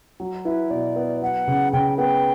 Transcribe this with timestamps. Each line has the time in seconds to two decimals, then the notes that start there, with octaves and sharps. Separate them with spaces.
0.20 F#3
0.45 E4 B4
0.70 B2 D5
0.96 B3
1.22 F#3 F#5
1.47 C#3
1.73 C#3 G5
1.98 B3 G5